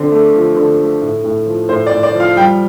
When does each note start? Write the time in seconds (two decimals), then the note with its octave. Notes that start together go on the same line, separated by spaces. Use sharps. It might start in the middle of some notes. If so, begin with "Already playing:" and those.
Already playing: D3 C4
0.12 A3
0.34 F3
0.56 D3
0.79 A3
1.02 A2
1.24 A2
1.46 F3
1.69 A2 C5
1.87 D5
1.92 A2
2.03 D5
2.15 F3
2.20 F5
2.37 G3 G5